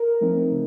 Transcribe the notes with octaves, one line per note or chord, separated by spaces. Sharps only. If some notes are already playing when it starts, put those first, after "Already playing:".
Already playing: A#4
F3 A3 C4 D#4
C#3